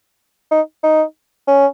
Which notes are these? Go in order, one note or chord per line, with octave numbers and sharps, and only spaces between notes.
D#4
D#4
C#4